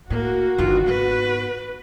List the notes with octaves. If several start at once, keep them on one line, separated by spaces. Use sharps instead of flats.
A2 A#3 F#4
G1 D#3 F4
G#2 B3 B4